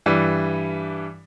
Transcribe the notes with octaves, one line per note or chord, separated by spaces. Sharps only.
G2 E3 G3